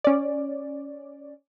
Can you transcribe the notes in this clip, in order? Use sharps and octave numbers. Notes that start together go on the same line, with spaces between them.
C#4 D5